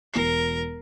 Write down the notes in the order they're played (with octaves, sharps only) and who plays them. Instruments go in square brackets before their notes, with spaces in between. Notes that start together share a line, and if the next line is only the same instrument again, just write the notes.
[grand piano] E1 C7 [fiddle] A#4